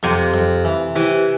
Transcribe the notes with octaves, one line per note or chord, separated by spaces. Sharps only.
F2 C3
F2
E3
C3 E3